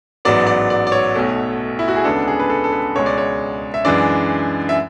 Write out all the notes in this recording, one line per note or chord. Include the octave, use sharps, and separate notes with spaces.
A1 G#2 F#3 B3 D5
D5
D5
D5
C#5
B1 B2 A3
E4
F#4
G#4
D2 C#3 G#3 B3 D4 A4
G#4
B4
A4
A4
B4
C#2 B2 G#3 C#5
D5
C#5
E5
F#2 E3 G#3 D4 D5
E5